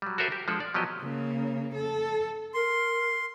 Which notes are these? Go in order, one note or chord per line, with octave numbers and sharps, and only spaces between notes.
F#3 G3
F#4 A4 A#4 C5 E5 G#5
G4
F3 G#3 D4 A4 D5
D5
F3 F#3 B3 G4 D#5
C#3 A#3
A4
A#4 C6